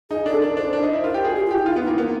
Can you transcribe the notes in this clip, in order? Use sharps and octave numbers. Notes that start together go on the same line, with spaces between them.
D#4 G#4
D4 A4
D4 A#4
D4 C5
D4
D#4
E4
F4 A#4
G4
G#4
F#4
G4 G#4
F4
G4
E4
D#4 F4
B3
E4
A#3
B3 A#4